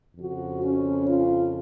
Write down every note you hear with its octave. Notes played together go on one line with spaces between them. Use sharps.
F2 C#3 F#4
C#4
F4